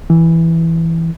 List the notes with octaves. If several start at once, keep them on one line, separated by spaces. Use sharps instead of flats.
E3